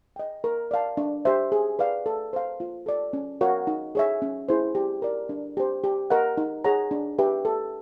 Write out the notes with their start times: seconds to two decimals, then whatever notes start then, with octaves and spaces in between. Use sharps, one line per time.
0.16 D#5 G5
0.44 A#4
0.71 D5 F5 A5
0.97 D4
1.25 G4 C5 E5
1.52 G#4
1.79 B4 D5 F5
2.06 A4
2.33 C5 F5
2.60 F4
2.86 A4 D5
3.13 C#4
3.41 F#4 A#4 C#5 F5
3.67 D#4
3.95 G#4 C#5 E5
4.22 C#4
4.49 E4 G#4 C5
4.75 G4
5.02 A#4 D5
5.29 D4
5.57 G4 C5
5.84 G4
6.10 A#4 D#5 F#5
6.37 D#4
6.64 G#4 C#5 F#5 A#5
6.91 D4
7.19 G4 B4 E5
7.45 A4